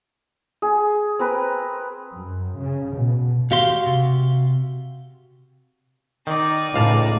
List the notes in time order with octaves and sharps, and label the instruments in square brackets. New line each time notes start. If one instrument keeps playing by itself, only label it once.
[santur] G#4
C4 A#4 B4
[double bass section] F#2
C#3
B2
[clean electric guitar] D#2 G4 C6 [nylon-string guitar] F#4 F5
[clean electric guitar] C3
[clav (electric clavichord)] D#3 [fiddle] D#4 D5
[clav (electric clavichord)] C#2 F5 A5 [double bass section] A2